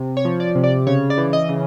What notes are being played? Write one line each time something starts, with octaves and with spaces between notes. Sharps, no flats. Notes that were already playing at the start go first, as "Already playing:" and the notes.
Already playing: C3
C#5
F3
D5
C3
D5
C#3 C#5
D5
E3
D#5
C#3